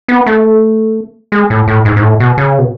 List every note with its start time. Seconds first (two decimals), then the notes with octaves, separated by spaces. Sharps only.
0.08 B3
0.27 A3
1.32 G#3
1.50 A2
1.68 A2
1.85 G#2
1.96 G#2
2.02 A2
2.20 B2
2.38 C#3
2.58 B2